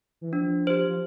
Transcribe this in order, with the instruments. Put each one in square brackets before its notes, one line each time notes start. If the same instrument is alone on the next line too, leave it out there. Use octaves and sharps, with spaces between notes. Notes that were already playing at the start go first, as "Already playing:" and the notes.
[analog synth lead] E3
[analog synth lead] F3 [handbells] D4
[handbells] G4 C5
[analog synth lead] F3